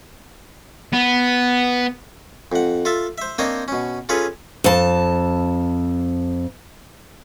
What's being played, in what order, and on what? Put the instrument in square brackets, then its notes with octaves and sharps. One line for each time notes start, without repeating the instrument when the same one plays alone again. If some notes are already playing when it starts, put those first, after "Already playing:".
[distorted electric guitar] B3
[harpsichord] F2 F#5
F4 A4 E5 A5
C5 E5
A#3 C4 D4 C5 C#5 D#5
B2 C#4
C#4 F4 G#4 A4 B4 C#5
[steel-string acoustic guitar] F2 A5